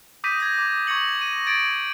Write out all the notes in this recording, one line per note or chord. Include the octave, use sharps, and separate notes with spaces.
D6 D#6 G6 A#6 B6 D#7
G#6 A#6
D6
C#6 G#6 A#6 C#7 F#7
A#6 D#7
G#6 A6 D7